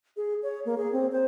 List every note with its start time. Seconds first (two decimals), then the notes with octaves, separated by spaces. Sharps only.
0.17 G#4
0.43 C#5
0.65 A#3
0.78 G#4
0.93 C4
1.12 C5